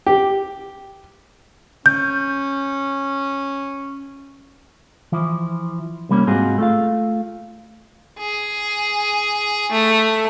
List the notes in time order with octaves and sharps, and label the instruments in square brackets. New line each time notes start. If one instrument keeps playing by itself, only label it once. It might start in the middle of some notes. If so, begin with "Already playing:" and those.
[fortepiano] G4
[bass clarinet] C#4 [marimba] G6
[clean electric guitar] E3 F3 E4
C2 G3 A#3 C#4
G#2 C4 F4 F#4 G#4
A3 F4 F5
[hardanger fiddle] G#4
A3